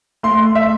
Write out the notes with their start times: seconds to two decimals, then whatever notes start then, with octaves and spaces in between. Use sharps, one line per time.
0.23 A3 C6
0.55 E5